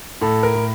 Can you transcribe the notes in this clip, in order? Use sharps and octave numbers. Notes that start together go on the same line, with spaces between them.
A2 A4
A#4
A2